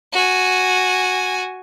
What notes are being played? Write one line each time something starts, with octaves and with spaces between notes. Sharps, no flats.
F#4 G#5